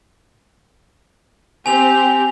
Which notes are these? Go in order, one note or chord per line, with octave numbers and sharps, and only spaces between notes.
C4 G4 G#5 F7